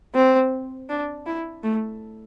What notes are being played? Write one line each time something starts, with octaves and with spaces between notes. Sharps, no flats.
C4
D4
E4
A3